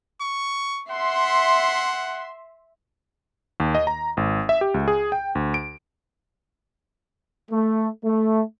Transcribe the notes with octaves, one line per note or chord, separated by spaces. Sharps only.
C#6
E5 F#5 C6
D#2
D#5
A#5
G#1
E5
G4
C#2
G#4
G5
D2
D7
A3
A3